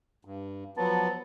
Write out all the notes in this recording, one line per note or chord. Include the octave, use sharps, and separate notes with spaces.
G2
F3 F#3 B3 A5